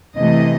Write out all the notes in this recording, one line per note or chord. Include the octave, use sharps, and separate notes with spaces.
C3 E3 A3 D#5